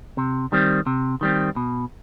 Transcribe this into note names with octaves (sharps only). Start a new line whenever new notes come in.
C3
D#3 G3 C4
C3
D#3 G3 C4
B2